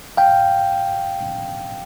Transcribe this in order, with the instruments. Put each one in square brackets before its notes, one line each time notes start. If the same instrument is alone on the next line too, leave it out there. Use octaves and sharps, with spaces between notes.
[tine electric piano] F5 G5